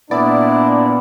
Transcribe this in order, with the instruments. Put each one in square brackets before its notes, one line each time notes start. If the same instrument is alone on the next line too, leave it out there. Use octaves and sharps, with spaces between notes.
[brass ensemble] A#2 D4 [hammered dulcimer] B3 [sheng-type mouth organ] E4 [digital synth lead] D5